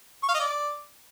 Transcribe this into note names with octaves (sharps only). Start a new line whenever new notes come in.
C#6
F5
D#5
D5